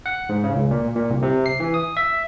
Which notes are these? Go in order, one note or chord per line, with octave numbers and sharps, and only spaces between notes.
F#5
G#2
C#3
C#2
A#2
A#2
C2
C3
C7
E3
D#6
E5